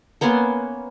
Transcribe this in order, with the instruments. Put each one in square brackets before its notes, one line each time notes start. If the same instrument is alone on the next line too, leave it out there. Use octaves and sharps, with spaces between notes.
[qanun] A#3 B3 C#4 C6